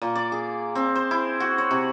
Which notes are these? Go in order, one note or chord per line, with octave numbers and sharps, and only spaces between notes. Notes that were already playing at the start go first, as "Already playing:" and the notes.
A#2
D5
G#4
C4
C5
E4
F#4
C#5
C3